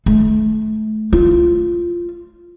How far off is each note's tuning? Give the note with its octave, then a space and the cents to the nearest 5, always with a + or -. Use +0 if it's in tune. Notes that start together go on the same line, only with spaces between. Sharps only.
A3 -30
F4 -10